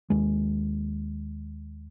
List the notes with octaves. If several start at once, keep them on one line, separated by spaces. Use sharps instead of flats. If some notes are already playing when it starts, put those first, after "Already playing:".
D#2 G#3